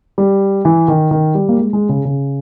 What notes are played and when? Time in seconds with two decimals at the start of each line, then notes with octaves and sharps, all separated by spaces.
0.18 G3
0.65 E3
0.88 D#3
1.11 D#3
1.35 G3
1.49 A#3
1.58 G#3
1.73 G#3
1.89 C#3
2.05 C#3